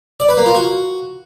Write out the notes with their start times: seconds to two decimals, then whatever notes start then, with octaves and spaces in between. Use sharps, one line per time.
0.20 D5
0.29 B4
0.37 A#3
0.46 F4
0.55 F#4